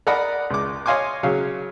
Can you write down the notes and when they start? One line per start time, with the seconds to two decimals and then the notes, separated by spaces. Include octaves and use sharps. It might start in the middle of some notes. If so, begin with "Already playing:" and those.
0.07 A#4 D5 D#5 F#5 A#5 B5
0.50 C#2 D6
0.86 C#5 D#5 F5 G#5 C6 D6
1.23 C#3 F#3 C#5 F5